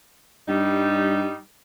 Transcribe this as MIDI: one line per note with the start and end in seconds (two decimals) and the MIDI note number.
0.48 1.30 43
0.48 1.38 55
0.48 1.38 63